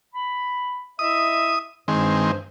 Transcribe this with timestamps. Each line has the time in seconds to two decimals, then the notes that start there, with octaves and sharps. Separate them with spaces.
0.15 B5
0.99 E4 D#5 E5 D#6
1.88 G2 D#3 G#3 C4 C5